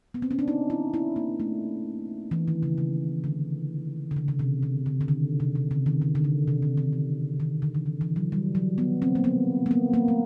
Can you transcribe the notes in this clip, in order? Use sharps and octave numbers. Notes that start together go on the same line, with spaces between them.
B3
C4
C#4
D4
D#4
E4
E4
A#3
A3
E3
D#3
C#3
C#3
D3
D3
C#3
C#3
C3
C3
C#3
D3
D#3
C3
C3
C#3
D#3
D3
D3
C#3
C3
C#3
D#3
E3
D#3
D3
E3
D#3
E3
F#3
G3
F#3
B3
C4
A#3
B3
A#3
B3
A#3
A3